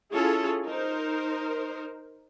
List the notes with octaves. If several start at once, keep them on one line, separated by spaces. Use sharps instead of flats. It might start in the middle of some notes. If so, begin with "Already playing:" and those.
C#4 E4 F4 G#4 A4 C#5
D#4 A#4 C5